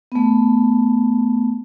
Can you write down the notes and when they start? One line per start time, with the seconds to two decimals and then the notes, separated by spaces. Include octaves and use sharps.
0.12 A3 B3